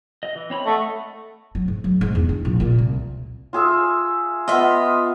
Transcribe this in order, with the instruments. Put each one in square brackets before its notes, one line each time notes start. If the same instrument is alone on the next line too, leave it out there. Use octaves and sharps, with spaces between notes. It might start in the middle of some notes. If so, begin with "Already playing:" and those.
[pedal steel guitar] D#5
E3
C4 C#5 B5
[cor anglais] A3 [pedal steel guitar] D#5 F#5 D#6
[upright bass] F#3
G#2
F#3
G#2
E2
D4
A#1
A#2
C2
[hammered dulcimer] F4 G#4 E5
[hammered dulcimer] B3 F4 [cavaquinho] D#5 E5